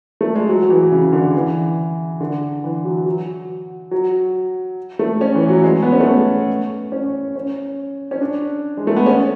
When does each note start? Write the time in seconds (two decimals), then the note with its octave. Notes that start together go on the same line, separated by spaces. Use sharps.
0.21 A3
0.35 G#3
0.49 F#3
0.62 F#3
0.70 E3
0.92 C#3
1.13 D3
1.35 E3
2.20 D3
2.64 E3
2.85 F#3
3.06 F#3
3.91 F#3
4.99 A3
5.21 C#4
5.35 E3
5.49 F#3
5.64 G#3
5.82 B3
5.92 C#4
6.00 A3
6.06 B3
6.92 C#4
7.35 C#4
8.11 C#4
8.21 D4
8.77 G#3
8.87 A3
8.96 B3
9.06 C#4